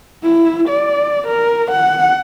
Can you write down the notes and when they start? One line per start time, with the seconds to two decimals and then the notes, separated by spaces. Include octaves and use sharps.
0.23 E4
0.69 D5
1.28 A#4
1.71 F#5